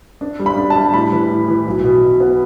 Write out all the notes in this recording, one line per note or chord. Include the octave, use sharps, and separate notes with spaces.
D4
G3
B5
D4
A5
G3
A2 B5
E3
A2
E3
B1
B2
B2
B3